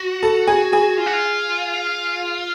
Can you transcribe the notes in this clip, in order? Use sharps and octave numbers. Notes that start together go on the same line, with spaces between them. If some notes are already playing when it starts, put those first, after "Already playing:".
Already playing: F#4
A4 A5
G#4 G#5
G#4 G#5
F4
F#4
F4